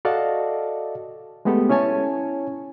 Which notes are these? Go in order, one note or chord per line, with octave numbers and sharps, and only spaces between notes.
F#4 A4 D5 D#5 F5 A5
G#3 A3 B3 G4 A4
C#4 E4 C#5 G#5 A5